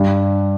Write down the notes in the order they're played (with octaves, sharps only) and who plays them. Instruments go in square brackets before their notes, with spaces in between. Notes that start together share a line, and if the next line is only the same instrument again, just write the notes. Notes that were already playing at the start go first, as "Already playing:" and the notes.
Already playing: [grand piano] G2